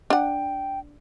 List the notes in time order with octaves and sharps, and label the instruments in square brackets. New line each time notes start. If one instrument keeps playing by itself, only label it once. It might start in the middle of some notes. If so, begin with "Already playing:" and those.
[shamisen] D4 F#5 [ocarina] G5